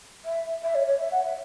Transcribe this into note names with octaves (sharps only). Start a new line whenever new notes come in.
E5
E5
C#5
C#5
E5
F#5
E5